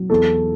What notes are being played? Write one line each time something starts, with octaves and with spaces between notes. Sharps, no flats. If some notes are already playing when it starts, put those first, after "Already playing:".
Already playing: F#3
E2 A4